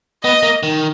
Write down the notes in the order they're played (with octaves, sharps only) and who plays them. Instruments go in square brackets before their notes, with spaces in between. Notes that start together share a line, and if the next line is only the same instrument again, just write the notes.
[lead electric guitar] B3 [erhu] D#5
[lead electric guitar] A#3
D#3